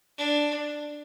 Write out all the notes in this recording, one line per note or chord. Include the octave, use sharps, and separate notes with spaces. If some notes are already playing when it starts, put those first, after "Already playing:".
D4